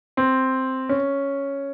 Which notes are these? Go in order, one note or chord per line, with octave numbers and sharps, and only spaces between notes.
C4
C#4